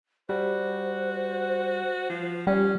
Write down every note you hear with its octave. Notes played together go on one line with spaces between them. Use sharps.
G3 F#4 C5
F3
G3 C#4 G5